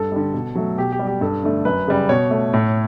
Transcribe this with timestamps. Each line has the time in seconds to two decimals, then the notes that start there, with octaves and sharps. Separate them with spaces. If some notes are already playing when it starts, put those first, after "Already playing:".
Already playing: G2 A4
0.12 D3 G3
0.33 B2
0.55 F#3 A3
0.77 B2 G4
0.92 G4
0.99 G3
1.07 G4
1.21 G2 A4
1.43 D3 A3
1.65 F#2 B4
1.88 C#3 G3
2.09 B2 C#5
2.31 A3
2.53 A2